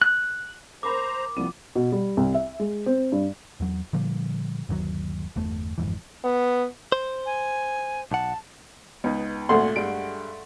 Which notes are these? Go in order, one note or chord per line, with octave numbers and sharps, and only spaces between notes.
F#6
A#4 C5 A#5 B5 D6
C2 F3 G3 B3 D#7
B2
G3
C2
E5
G#3
C4
G2
E2 F#3
A#2 D3 F3 G3
G1 D#2 C3 F#3
G1 E2 A3
G1 F2 G#2 E3
B3
C5
G#5
B1 F#5 A5
C#2 B3 D#4
G#1 D2 A#2 A3 F#5 C6
G2 G#3 D7